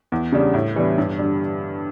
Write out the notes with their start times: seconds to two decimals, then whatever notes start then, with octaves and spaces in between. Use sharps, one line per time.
0.12 E2
0.32 C#3 G3 D4
0.54 A2
0.76 E3 G3 B3 D4
0.98 G2
1.19 D3 G3 D4